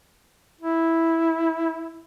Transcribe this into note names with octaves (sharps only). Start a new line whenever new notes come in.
E4